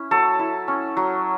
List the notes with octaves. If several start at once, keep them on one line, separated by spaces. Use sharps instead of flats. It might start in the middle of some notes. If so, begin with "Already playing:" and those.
Already playing: C#4 E4
F#3 A4
E4
C#4
F#3